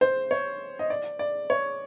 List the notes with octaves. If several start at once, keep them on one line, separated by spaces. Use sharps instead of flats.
C5
C#5
D#5
D5
D5
C#5